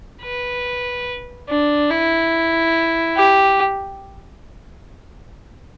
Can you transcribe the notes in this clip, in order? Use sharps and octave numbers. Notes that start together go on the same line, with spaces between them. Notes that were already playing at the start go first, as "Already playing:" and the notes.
B4
D4
E4
G4